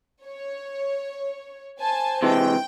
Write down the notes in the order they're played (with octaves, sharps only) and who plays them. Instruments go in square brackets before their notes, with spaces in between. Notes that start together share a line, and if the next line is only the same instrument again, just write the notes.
[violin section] C#5
C5 G#5 A5
[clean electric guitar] C3 E3 G#3 [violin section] G5